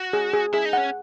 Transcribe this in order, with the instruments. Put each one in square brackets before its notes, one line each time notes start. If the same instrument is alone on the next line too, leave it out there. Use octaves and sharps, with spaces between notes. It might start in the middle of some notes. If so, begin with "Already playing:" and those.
Already playing: [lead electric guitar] F#4
[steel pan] G#4
G#4
[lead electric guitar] E4 [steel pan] G#4
[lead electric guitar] D#4
[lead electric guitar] C#4 [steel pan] F#5